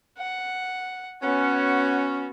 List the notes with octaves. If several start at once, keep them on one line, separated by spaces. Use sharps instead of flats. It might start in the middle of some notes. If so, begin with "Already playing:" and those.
F#5
B3 C#4 F#4 F#5